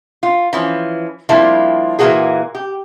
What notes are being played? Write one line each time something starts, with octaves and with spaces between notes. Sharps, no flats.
F4
E3 F3 C#4
F3 G3 A#3 C4 D4 E4
A#2 E3 F#3 A#3 F#4 G#4
G4